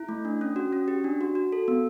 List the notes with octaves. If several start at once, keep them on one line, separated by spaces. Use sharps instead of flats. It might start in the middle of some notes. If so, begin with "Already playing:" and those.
Already playing: E4
A3
D4
C#4
F#4
C#4
G4
D4
F#4
F#4
A4
B3